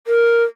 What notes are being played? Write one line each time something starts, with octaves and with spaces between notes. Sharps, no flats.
A#4